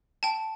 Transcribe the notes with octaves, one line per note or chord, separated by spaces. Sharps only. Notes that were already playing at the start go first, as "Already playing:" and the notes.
G5 A5